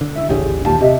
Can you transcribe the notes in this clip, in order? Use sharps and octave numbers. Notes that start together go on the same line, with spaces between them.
D3
E4 E5
D#1 A1 D3 G4 G#4 C#5
D#2 A#2 F4 G4 A5
C3 G4 D#5 E5